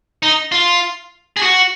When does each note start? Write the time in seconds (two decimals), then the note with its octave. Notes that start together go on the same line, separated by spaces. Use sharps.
0.23 D#4
0.52 F4
1.37 G#4
1.42 F#4